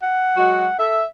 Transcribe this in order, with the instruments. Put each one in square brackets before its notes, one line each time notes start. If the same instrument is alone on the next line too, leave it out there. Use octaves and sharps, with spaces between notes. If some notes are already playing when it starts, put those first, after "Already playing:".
[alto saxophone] F#5
[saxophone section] F#3 G#3 F#4
[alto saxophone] A4 [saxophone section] E5